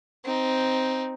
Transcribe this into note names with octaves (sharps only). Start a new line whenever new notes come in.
C4 D#4